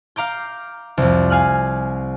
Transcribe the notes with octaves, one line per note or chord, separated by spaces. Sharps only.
F5 A#5 D6 G6
C2 F2
F5 G#5 F6 F#6